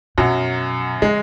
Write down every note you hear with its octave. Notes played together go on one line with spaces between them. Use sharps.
F#2 B2 F#3
C#3 G#3